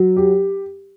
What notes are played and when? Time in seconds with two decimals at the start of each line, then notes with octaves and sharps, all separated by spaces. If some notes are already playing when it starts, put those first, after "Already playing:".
Already playing: F#3
0.17 G4